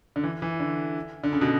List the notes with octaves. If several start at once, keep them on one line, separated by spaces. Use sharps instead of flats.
D3
E3
E3
D3
D3
C#3
B2